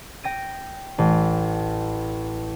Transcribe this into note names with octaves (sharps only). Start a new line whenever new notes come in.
G5 A#6 D#7
A1